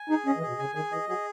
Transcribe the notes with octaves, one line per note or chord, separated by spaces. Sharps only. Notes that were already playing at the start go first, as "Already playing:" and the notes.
Already playing: G#5
D#4 G#4
C#4 D#5
E3
G#4
B2
C#3 G#5
D#3 G#4
E3 D#5
F#3 G#4